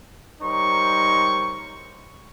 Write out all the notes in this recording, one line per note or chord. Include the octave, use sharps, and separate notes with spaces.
G3 D#4 A#4 C5 C#5 C#6